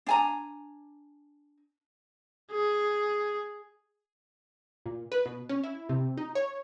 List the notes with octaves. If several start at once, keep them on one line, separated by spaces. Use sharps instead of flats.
D4 G#5 A#5
G#4
A#2
B4
B2
C#4
E4
C3
D#4
C#5